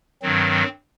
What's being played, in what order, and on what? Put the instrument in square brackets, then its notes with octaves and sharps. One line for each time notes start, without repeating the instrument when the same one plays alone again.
[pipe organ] G2 D#3 F#3 C4